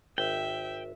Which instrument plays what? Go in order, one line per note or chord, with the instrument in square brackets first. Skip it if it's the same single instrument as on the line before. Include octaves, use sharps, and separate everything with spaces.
[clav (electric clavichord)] G#1 [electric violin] E5 [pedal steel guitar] G5